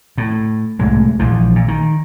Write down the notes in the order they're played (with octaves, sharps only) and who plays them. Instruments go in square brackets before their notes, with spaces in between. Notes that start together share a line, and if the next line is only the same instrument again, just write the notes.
[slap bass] A2
C2 A2 G#3
A#1 E3 F3
A#2
D#3